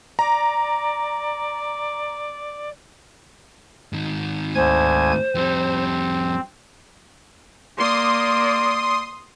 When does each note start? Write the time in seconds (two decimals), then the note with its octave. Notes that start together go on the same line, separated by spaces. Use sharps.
0.19 D5 A#5
3.93 G#2 D#3
4.55 D2 C5 G#5 G#6
5.35 F2 G3 C4
7.77 A#3 D5 C6 D#6